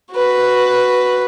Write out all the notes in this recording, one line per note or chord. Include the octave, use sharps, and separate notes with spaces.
F#4 B4